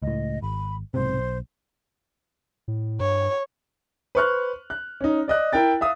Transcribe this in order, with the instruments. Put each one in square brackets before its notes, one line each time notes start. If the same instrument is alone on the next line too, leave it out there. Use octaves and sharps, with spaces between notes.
[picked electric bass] C#2 A2 [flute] D#5
[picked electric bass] G#1 [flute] B5
[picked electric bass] B1 G#2 C3 [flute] C5
[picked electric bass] B1
[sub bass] A2
[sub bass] G2 [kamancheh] C#5
[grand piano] B4 C5 C#6 F6 F#6
F#6
C#4 D#4
D5 D#5 F#6
E4 A#4 G5 A6
E5 F5 D#6